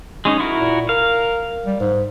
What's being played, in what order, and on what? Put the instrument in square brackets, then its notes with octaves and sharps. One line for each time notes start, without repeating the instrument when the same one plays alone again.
[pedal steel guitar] G#3 C#4 D#4
E4 F#4 A#4
[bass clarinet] A#2
[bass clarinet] A#4 [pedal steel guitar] F5
[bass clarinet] G3
G#2